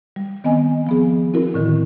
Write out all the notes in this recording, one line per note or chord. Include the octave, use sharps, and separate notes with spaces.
G3
D#3 B3 C4 D#5 G#5
F3 B3 G#4
C4 E4 F#4 A#4
A2 D3 D#3